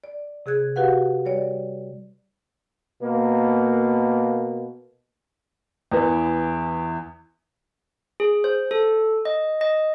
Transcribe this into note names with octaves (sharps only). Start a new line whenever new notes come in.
D5
C3 G#4 F#6 G#6
F#4 G4 B4 F5 F#5
G3 C#5 D5
B2 A#3
E2 E3
G#4
C5
A4
D#5
D#5